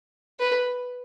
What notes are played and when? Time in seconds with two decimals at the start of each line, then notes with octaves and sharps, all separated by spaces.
0.40 B4